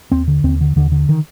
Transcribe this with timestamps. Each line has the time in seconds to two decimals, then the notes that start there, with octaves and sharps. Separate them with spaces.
0.12 D#2 C4
0.28 D3
0.44 D#2 C4
0.61 D3
0.76 D#2 D3
0.92 D3
1.09 D#3